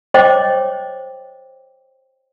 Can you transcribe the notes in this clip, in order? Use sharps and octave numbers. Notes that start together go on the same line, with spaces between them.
C5 C#5 D#5 G5 D6